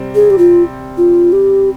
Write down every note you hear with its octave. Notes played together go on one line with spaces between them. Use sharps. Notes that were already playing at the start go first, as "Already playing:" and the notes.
Already playing: C3 G3 C4
G#4
G4
F4
F4
G4